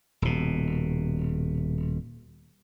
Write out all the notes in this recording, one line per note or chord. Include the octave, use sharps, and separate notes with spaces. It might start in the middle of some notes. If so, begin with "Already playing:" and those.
D#1 B2